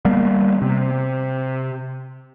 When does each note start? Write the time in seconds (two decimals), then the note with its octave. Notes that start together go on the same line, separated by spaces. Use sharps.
0.05 G3 A#3 B3
0.62 C3